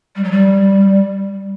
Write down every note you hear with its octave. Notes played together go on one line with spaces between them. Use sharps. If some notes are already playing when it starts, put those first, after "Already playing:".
G3
F#3
G3